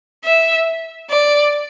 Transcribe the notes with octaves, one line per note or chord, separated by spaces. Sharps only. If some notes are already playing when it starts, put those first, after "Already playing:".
E5
D5